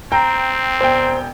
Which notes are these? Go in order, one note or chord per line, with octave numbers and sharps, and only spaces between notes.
C4 G5 A#5
E1 C5 G5